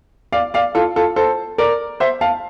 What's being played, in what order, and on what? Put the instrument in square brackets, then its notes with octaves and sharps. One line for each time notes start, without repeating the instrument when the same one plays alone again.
[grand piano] D5 F5
D5 F5
F4 A4
F4 A4
A4 C5
A#4 D5
C5 E5
F5 A5